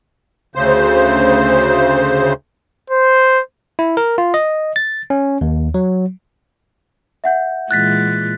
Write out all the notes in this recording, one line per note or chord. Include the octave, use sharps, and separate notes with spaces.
D2 C#3 C5
C5
E4
A#4
F4
D#5
A6
C#4
D#2
F#3
E5 F#5 G6
A#2 E3 G#3 F#6 A6 B6